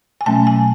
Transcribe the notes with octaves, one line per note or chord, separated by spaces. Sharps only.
G#5
B2 F#3 A3 C#4 A5
G#5